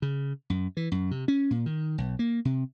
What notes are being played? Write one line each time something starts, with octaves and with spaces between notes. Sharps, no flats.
C#3
F#2
E3
F#2
C3
C#4
A#2
D#3
B1
A#3
C3